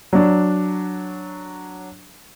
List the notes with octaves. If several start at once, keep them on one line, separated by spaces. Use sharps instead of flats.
F#3 D4